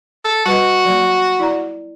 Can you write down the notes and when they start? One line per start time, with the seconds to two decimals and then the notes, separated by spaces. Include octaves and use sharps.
0.25 A4
0.45 G3 F#4 B4 D#5
0.85 F#3 A#3
1.39 E4 D5 A#5